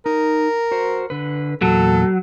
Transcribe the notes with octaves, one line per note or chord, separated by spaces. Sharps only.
D#4 A#4
F#4 C5
D3 B4
E2 A#2 F#3 A4